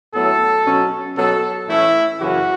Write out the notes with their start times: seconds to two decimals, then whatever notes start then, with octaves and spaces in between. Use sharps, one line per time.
0.14 A2 F#3 B3 A4
0.66 B2 F#3 C#4
1.17 B2 F#3 B3 A4
1.69 A2 E3 A3 C#4 E4
2.20 F#2 C#3 E3 C#4 F#4